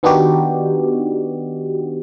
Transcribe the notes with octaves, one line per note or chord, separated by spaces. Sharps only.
D#3 B3 D4 D#4 F#4 G4